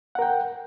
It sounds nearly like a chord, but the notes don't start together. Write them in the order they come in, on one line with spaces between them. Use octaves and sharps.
F#5 A#4 G5